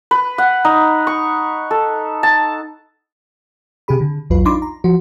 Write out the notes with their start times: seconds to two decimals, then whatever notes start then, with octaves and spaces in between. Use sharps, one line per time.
0.11 B4
0.38 F#5
0.65 D#4
1.07 C#6
1.71 A4
2.23 A5
3.88 C3 G4 G#4 B5
4.01 D3
4.30 A#1 E2 F#3 F4 B4
4.45 D4 D#4 F4 B5 C6 D6
4.62 A#5
4.84 F3 F#4